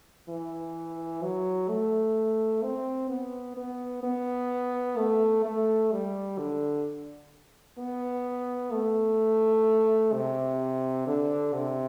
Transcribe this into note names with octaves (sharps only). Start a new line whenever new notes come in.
E3
F#3
A3
C4
B3
B3
B3
A3
A3
G3
D3
B3
A3
C3
D3
C3